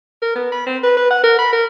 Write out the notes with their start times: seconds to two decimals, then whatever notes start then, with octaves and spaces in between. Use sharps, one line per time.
0.22 A#4
0.35 B3
0.52 B5
0.66 C4
0.83 B4
0.97 B4
1.11 F#5
1.24 A#4
1.39 B5
1.53 A#4